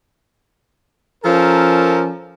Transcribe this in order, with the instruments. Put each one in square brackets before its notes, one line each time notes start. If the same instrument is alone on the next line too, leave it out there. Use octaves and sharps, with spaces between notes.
[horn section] F3 C#4 A4 A#4